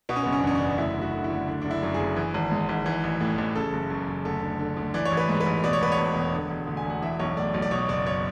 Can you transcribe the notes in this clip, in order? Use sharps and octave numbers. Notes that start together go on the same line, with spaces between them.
B2 B3
C#4
B3
F#1
C#4
D4
E2 C#4
D4
F#1
D2 E4
D3
F#4
D3
E4
D2
D3 D4
F#1 D4
E4
F#2
G#4
F#1
E3
G#1
G#2
G#1
E3
A1
A2
A1
C#3 A4
F#1
F#2
F#1
D2 A4
D3
D3
D2
E3 D5
C#5
A1
B4
G#2
B4
A1
B2 D5
C#5
E1 B4
C#5
E2
E1
D3
E1
D2
G#5
E1
F#5
E3 E5
B1 C#5
A2 D5
B1
D5
B2 C#5
F#1 D5
C#5